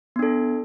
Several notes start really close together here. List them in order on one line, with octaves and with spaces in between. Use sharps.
B3 D4 A4